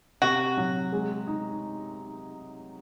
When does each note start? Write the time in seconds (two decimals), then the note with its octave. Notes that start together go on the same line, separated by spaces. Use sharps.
0.22 C3 F#4
0.57 F#3
0.92 G#3
1.27 D#4